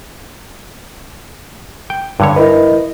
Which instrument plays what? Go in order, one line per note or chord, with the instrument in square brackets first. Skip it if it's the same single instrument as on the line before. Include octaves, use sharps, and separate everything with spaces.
[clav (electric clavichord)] G5
G2 D3 C#5
[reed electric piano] E4 A#4 B4 [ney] D#5